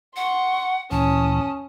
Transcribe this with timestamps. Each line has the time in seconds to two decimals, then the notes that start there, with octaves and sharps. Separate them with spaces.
0.16 F#5 C6 C#6
0.91 D2 A#2 E3 C#4 A5 D#6